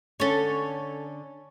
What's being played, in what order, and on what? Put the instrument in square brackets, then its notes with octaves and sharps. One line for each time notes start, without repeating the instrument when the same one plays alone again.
[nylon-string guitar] D3 C#4 [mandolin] A4 C#5